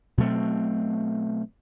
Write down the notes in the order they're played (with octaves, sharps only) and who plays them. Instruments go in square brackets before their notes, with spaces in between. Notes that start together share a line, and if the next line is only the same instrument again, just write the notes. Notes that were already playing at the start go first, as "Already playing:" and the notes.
[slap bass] B2 F#3 A3 C4